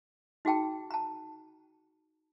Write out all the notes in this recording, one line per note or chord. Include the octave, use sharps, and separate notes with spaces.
D#4 F#4 G#4 G5 A5
A5 A#5